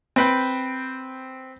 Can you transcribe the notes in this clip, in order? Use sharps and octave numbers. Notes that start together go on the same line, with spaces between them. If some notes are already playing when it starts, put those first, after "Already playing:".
C4 B4 G5